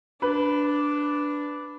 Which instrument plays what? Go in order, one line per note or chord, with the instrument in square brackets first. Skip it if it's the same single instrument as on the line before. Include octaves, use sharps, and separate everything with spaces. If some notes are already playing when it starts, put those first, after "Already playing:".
[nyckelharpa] D4 [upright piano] B4